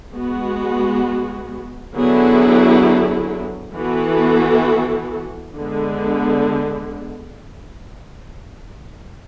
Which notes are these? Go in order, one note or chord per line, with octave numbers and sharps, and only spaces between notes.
G#3 B3 F#4
D3 F#3 B3 E4 G#4
E3 B3 F#4 A4
D3 G#3 B3